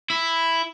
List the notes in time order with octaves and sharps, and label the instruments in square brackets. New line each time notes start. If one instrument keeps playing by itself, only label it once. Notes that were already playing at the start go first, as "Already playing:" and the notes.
[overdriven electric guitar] E4